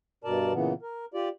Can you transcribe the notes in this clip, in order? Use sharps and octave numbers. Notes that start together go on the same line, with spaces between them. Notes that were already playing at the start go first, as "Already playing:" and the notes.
G2 B2 A#4 D5 A5
A#2 C#3 E3 B3
A#4
F4 G4 D5